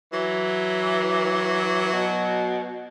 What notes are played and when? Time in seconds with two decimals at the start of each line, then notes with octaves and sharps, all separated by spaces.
0.13 E3 F#3
1.93 B2